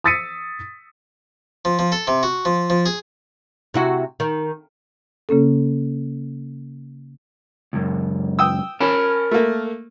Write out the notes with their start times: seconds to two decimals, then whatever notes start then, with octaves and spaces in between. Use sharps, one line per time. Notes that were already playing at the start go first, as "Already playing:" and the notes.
0.04 D#6 E6 A6 B6 C#7 D#7
1.65 F3
1.79 F3
1.92 A4
2.07 C3
2.23 F#4
2.45 F3
2.70 F3
2.86 G#4
3.74 C3 E4 F#4
4.20 D#3
5.29 C#3 A#3 C#4 A4
7.73 C#2 F#2
8.39 G5 D#6 E6
8.80 C#4 A#4 A5 B5
9.31 A3 A#3